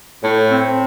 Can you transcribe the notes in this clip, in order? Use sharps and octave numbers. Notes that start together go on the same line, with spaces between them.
A2
C4